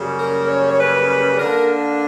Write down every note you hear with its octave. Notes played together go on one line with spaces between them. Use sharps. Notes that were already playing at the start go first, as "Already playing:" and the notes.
Already playing: F#2 C#3 G3 A#3
A#4
C#5
C#5
B4
B4
D3 A#3 D4 A#4